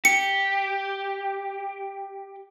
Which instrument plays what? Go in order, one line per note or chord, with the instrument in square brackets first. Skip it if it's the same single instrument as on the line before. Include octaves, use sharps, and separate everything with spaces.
[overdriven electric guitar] G4 [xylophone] C#7